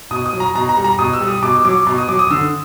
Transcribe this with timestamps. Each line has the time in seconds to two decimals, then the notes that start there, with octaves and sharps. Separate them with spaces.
0.11 B2 D#6
0.26 D#6
0.33 F#3
0.40 A#5
0.55 B2 A#5
0.69 A#5
0.77 G3
0.84 A#5
0.99 B2 D#6
1.13 E6
1.21 G3
1.28 D#6
1.42 B2 D6
1.65 F#3 D6
1.87 B2
1.98 D#6
2.08 F#3 D6
2.19 D#6
2.31 D3 E6